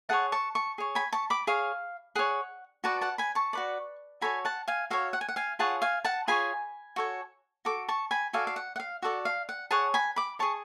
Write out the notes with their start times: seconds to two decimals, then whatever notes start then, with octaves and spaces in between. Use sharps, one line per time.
0.09 G#4 C#5 F#5 A5
0.32 A5 C#6
0.55 A5 C#6
0.78 G#4 C#5
0.95 G#5 B5
1.13 A5 C#6
1.30 B5 D6
1.47 G#4 C#5 F5
2.15 G#4 C#5 F#5
2.84 F#4 B4 D5 F#5 A5
3.01 F#5 A5
3.18 G#5 B5
3.35 A5 C#6
3.53 F#4 B4 D5
4.21 F#4 A4 C#5 G#5 B5
4.45 F#5 A5
4.68 F5 G#5
4.90 F#4 A4 C#5 F5
5.13 F#5
5.21 G#5
5.29 F#5
5.36 F5 G#5
5.59 F4 G#4 C#5 F#5 A5
5.82 F5 G#5
6.05 F#5 A5
6.28 F4 G#4 C#5 G#5 B5
6.96 F#4 A4 C#5
7.65 F#4 A4 D6
7.88 A5 C#6
8.11 G#5 B5
8.33 F#4 A4 D5 F5 G#5
8.47 F5
8.56 F#5
8.76 F#5
8.80 F5
9.02 F#4 A4 D5 F#5
9.25 F5
9.49 F#5
9.71 G#4 C#5 F#5 A5
9.94 G#5 B5
10.16 B5 D6
10.39 G#4 C#5 A5 C#6